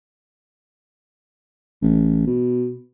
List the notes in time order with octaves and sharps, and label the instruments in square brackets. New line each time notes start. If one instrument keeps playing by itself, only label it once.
[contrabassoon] A1
B2